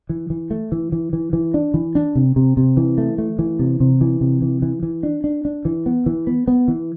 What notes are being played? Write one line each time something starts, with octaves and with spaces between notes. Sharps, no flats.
E3
E3
A3
E3
E3
E3
E3
D4
E3
D4
C3
C3
C3
E3
A3
A3
E3
C3
C3
E3
C3
E3
E3
E3
D4
D4
D4
E3
B3
E3
B3
B3
E3